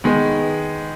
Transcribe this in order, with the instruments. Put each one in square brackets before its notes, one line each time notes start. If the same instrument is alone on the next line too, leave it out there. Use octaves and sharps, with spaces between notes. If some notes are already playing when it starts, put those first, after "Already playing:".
[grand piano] D#3 G#3 B3